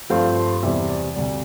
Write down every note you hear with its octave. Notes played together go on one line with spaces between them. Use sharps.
G2 F3 A3 C4 F5
C6
E2 C3 G3 C4 E5
D5
D2 C3 G3 D5